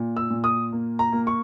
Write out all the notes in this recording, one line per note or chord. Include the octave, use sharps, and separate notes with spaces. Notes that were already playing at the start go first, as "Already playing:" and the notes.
Already playing: A#2
E6
A#2
D#6
A#3
A#5
A#3
C#6